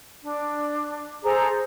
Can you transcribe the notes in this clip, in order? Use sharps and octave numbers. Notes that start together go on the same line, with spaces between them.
D4
G#4 A4 C5 A#5